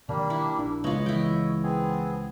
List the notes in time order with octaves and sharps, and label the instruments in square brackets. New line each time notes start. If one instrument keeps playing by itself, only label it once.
[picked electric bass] B2 D#3 [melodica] G3 A#3 D4
[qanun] E4
[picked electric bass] A#1 D4
[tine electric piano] C#2 [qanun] B3 F4 [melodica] C#5 D#5
[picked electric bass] E3 [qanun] E4 G5
[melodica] B3 C4 G#4